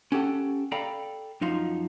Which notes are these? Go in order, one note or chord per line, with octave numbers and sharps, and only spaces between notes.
C#4 G4 A4 F#5 A5
A4 D5 F5 G5 A#5 B5
F#2 F3 D#4 F5 C6